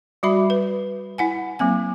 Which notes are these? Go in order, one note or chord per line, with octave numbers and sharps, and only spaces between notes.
G3 F#4 E5 B5
B4
E4 F#5 G#5
F#3 A#3 C4 G#5